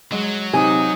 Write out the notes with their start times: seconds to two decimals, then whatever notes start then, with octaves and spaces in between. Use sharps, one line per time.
0.12 F#3 G#3
0.53 C3 D#4 G#5